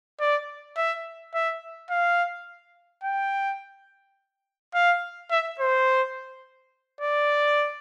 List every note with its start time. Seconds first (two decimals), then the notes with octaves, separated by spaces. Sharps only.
0.21 D5
0.77 E5
1.34 E5
1.90 F5
3.04 G5
4.75 F5
5.31 E5
5.60 C5
7.01 D5